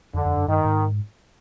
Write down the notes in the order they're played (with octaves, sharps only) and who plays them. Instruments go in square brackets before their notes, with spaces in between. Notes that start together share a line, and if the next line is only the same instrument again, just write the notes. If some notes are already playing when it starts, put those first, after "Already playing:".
[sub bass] F2 [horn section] D3
[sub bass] F2
F#2
[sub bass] G2 [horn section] D#3
[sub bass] G#2